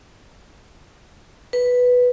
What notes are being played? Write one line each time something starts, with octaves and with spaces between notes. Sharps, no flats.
B4